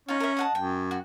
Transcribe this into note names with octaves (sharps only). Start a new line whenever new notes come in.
C#4 D#4 F4
A#4 E5
D#5 F#5 A5
F#2 G5
F#4